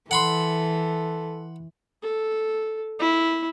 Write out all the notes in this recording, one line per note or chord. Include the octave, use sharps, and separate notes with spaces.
E3 A4 F#5 B5 C6
A4
E4